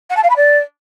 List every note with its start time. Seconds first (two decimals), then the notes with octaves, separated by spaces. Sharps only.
0.10 F#5
0.16 A5
0.23 F5
0.29 B5
0.36 D5